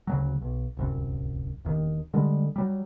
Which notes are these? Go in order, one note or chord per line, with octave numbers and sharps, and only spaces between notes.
D2 C#3 F#3
B1
D1 C2 F#2
E1 D#2 D#3
D3 G3 G#3
F#3 G3